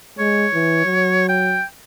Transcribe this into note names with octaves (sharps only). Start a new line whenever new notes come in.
G#3 C#5
E3
F#3
G5